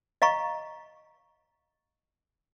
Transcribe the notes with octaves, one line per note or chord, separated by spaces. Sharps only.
D#5 F5 A#5 C#6